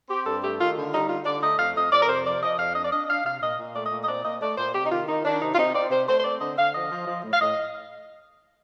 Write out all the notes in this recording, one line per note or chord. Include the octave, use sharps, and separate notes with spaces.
C4 G4
G2 A4
A3 G4
D#3 F4
D3
G3 D#4
D3 F4
D3 D5
A3 D#5
F2 F5
F2 D#5
F2 D5
A#4
C3 C5
F3 D5
F3 D#5
F2 F5
D4 D#5
D5
D4 D#5
D4 F5
C3 F5
A#2 D#5
A#2
A3 D5
D#5
A#2
D#5
C4 D5
A#2 D#5
A3 D5
A#2 C5
C3 G4
D#4
D#3 F4
D#3 D#4
D#3 D4
C3 D#4
F4
C3 D#4
C4 D5
C3 C5
A3 C5
C5
C4 D5
D3 D#5
D3 F5
F3 D#5
F3
F3
A2
F5
A2 D#5